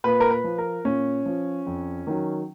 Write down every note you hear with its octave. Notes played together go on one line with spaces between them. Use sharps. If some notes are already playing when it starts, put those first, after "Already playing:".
A#2 B4
A#4
B4
F3
A#4
A#2 C#4
F3
F2
D#3 F#3